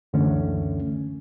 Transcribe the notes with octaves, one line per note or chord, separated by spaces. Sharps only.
C#2 F#2 D3 E3 A3 C#4